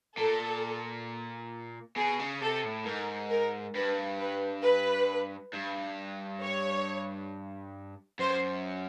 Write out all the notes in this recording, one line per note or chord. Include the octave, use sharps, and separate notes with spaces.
A#2 A4
B2 G#4
C#3
C3 A4
A2
G#2 A#4
A#4
G2 B4
B4
B4
G2
C#5
F#2 C5